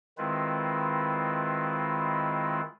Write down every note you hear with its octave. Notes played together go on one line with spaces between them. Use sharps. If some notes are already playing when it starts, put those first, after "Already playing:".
D#3 G#3 C4 E4 F4 B4